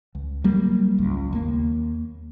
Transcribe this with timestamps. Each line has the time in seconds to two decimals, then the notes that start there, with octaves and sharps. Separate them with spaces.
0.15 C#2
0.44 F#3 G3 A#3
0.98 G#1 C#2
1.33 D#2 A#3